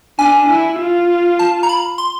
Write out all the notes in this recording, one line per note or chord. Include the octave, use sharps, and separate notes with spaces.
D4 G#5
E4
F4
A5
A#5
B5
C6